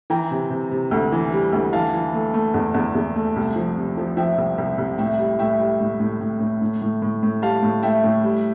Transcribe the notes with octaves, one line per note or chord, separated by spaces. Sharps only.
E3 G5 A#5
C3
C3
C3
D2
E3
G3
D2
E3 F5 A5
E3
A3
A3
E2
E2
E2
A3
C2
F3
C3
F3
F3 E5 G5
C2
C2
C2
A2 E5 G5
G3
A2 E5 G5
G3
A2
A2
A2
A2
A2
A2
A2
A2
G3 F5 A5
A2
A2 E5 G5
A2
G3